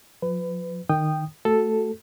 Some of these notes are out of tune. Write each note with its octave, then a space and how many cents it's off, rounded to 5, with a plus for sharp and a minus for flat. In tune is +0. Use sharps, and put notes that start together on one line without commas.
F3 +40 B4 +25
D#3 -20 G5 +0 D#6 -15
A3 +0 F#4 +10 A4 +0